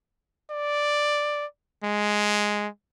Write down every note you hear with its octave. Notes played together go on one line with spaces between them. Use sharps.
D5
G#3